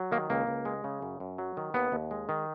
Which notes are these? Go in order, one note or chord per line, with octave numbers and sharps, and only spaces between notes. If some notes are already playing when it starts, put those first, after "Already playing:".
Already playing: F#3
D#3 A#3
C#2 A#3
C#2
G#3
C#3
F#2
F#2
F#3
D#3
D#2 B3
D#2
G#3
D#3